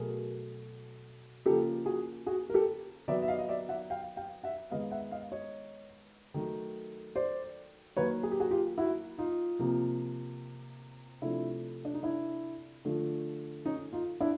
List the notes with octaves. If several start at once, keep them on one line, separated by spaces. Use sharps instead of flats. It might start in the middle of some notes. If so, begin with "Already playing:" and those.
Already playing: B2 F#3 A3 G#4 A#4
C#3 F3 A#3 G4 A4
F#4 G#4
F#4 G#4
A#4
G4 A4
D#3 F#3 B3 D5 E5
E5
D#5 F5
D#5
D5 E5
E5 F#5
F5 G5
F5 G5
E5 F#5
D#3 G#3 B3 D#5 F5
E5 F#5
D#5 F5
C#5 D#5
D#3 F#3 A3
C5 D5
D#3 F#3 A#3 B4 C#5
G#4
G4
F#4 G#4
F4 G4
E4 F#4
D#4 F4
C3 F3 A#3
C3 F3 A3 D4 E4
D4
D#4
D4 E4
D3 F3 A3
C#4 D#4
D#4 F4
D4 E4